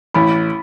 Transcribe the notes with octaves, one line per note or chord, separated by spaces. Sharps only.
A1 B5